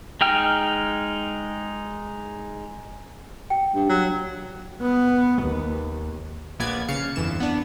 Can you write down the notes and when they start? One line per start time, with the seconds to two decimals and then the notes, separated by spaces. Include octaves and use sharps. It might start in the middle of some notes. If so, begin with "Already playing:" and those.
0.21 G#3 D#4 G5 F6
3.50 G5
3.75 G2
3.89 F#3
4.82 B3
5.43 D#2
6.59 A#1 A#2 B3 D5 G#6
6.88 C#3 F5 C#7
7.16 G1 F2 E3 E7
7.40 B3 D4